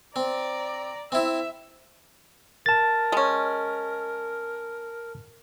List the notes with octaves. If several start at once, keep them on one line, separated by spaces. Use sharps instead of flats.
C4 D5 A#5
C4 E4 E5
A#4 A5 A6
G#3 C#4